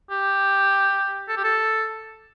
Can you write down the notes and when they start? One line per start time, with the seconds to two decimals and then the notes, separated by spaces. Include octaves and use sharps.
0.11 G4
1.28 A4
1.37 G4
1.44 A4